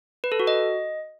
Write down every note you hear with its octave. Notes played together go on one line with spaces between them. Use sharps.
B4
A4
F#4
D#5